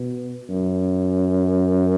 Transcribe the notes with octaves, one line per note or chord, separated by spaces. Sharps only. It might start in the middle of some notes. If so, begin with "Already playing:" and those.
Already playing: B2
F#2